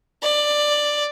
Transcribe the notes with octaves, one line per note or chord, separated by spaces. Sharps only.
D5